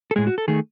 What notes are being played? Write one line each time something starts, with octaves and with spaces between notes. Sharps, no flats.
A4
A2 G#3 G#4
F#4
A4
D#3 A3 G#4